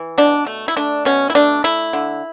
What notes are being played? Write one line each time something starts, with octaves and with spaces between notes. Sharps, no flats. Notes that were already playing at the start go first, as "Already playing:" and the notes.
Already playing: E3
B2 D4
A3
E4
A3 D4
B2 C#4
E4
A3 D4
A3 E4
D3